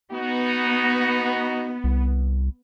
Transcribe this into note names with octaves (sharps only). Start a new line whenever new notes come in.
B3 D#4 F#4
C2